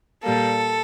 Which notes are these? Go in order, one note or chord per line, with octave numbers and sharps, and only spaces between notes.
A#2 G3 A#3 A4